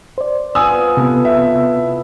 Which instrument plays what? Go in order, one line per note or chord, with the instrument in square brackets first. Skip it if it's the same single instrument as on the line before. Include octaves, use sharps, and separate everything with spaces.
[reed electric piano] C5 D5
[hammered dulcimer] B3 F4 B5 [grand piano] G#5 D#6 E6
[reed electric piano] C3 B3 [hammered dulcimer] A4 B4 D#5
[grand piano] E5
[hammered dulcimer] E4